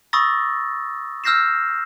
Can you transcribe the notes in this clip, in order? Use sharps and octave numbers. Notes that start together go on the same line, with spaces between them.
B5 C#6 D#6 E6 A6 A#6
E6 F6 G6 A#6 C7 E7